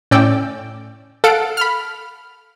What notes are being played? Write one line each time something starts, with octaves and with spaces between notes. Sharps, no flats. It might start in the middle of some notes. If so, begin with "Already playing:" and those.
A2 C#4 D5 G5 E6
A4 F5 F#5 D7
B5 F6